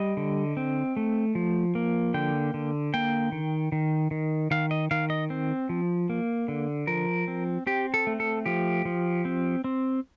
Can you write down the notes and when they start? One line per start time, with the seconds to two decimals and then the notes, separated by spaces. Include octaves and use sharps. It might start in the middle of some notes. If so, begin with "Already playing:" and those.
Already playing: G3 D#5
0.17 D3
0.57 C4
0.97 A3
1.35 F3
1.75 A#3
2.14 D3 G5
2.54 D3
2.94 A#3 G5
3.32 D#3
3.72 D#3
4.11 D#3
4.51 D#3 F5
4.71 D#5
4.91 D#3 F5
5.10 D#5
5.30 C4
5.69 F3
6.10 A#3
6.48 D3
6.87 F3 A#4
7.28 C4
7.67 C4 G4
7.94 A4
8.07 A3
8.20 A4
8.46 F3 G4
8.85 F3
9.25 C4
9.64 C4